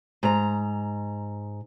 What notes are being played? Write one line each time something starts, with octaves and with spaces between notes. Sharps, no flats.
G#2 A#5